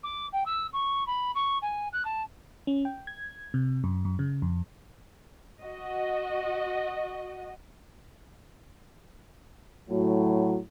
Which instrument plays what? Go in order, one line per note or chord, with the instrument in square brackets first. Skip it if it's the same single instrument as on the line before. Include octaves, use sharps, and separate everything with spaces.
[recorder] D6
G5
E6
C#6
B5
C#6
G#5
F#6
A5
[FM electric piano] C#4
G5
G#6
C3
F#2
F#2
C#3
F2
[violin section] F#4 D#5
[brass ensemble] A2 F#3